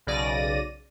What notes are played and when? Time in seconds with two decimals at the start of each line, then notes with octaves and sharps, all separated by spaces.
0.07 B1 C#3 D5 A#6 D#7